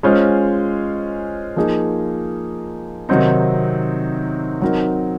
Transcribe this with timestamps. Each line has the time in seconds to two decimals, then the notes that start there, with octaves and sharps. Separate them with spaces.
0.03 G#3 C#4 F4 C5
1.56 F3 A#3 D#4 G#4
3.09 C3 D#3 F#3 C4 D#4
4.61 F#3 C4 D#4 A#4